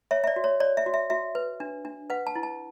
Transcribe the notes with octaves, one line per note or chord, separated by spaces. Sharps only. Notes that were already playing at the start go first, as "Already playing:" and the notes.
C#5 E5
E5
D5
F#4
C#5
C#5 D5
E5
F#4
E5
F#4 E5
B4
D4
D4
B4 F#5
A5
E4
A5